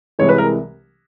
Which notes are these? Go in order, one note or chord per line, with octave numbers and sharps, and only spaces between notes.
C2 C3 E3 G#3 C#5
B4
A#4